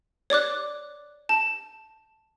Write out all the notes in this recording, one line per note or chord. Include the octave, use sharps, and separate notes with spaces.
C#5 D5 D6 F#6
A5